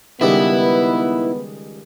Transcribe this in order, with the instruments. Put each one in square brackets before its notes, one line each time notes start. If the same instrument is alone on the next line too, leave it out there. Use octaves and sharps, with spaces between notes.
[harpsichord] C#2 D#3 G3 [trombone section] B3 D#4 B4 [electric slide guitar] E4